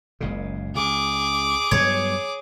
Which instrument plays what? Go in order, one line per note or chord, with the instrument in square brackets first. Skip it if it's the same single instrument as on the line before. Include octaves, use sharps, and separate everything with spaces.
[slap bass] F#1 C#2 C#3
[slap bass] C#2 [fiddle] G#4 D6
[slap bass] G2 F#3 B3 [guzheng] C#5